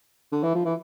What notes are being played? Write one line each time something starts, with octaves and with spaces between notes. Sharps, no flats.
D3
E3
F3
E3